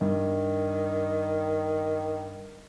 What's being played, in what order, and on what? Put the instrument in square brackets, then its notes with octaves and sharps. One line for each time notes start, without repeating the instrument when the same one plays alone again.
[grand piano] G2 [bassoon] D#3